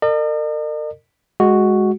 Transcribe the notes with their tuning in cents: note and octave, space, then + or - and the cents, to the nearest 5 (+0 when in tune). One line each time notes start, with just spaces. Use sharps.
A#4 -40 D#5 -45
G#3 +0 F#4 +0